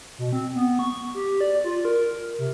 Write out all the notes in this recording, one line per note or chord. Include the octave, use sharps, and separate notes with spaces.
B2
C4
B3
C#6
G4
D5
F4
A#4
C3